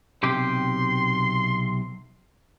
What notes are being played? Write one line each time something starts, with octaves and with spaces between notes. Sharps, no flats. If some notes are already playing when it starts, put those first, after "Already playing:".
B1 C3 G4 C6